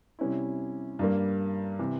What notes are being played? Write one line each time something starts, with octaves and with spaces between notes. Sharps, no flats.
C3 G3 C#4 E4
G2 G3 A#3
C3 E3